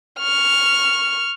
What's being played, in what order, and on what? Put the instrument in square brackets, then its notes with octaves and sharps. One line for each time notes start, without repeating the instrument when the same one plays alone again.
[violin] C#6 F6